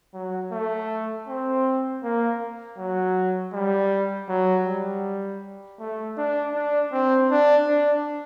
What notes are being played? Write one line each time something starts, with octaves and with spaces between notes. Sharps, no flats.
F#3
A3
C4
A#3
F#3
G3
F#3
G3
A3
D4
D4
C4
D4
D4